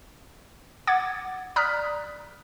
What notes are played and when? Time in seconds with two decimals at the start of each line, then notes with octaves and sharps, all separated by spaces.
0.87 F#5 D6 G#6 A6
1.56 D5 A#5 D#6 F6 F#6 B6